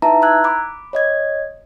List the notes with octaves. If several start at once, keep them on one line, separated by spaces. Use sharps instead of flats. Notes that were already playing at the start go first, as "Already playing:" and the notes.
D#4 E4 B4 E5 A5 A#5
A#5 E6 F#6 G#6
B5 D6
C#5 D#5 G#6